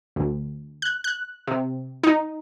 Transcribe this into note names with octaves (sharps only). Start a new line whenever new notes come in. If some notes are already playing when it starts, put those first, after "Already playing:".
D2
F#6
F#6
C3
D#4